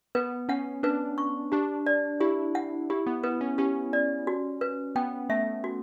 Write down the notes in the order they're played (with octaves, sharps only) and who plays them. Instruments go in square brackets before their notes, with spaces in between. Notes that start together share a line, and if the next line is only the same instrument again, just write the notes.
[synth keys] B3 [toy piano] B4
[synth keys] C#4 [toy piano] F#5
[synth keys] D4 [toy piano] B4
[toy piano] C#6
[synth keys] D4 [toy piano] G4
[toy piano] D5
[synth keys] E4 [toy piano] G4
[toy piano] F#5
[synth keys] E4 [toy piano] G4
[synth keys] B3
[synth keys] B3 [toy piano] B4
[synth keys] C#4
[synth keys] C#4 [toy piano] G4
[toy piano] D5
F#4
B4
[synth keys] B3 [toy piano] G5
[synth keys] A3 [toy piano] E5
[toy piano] F#4